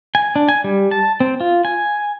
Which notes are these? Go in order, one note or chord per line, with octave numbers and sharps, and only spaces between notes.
G#5
D4
G#5
G3
A5
C4
F4
G#5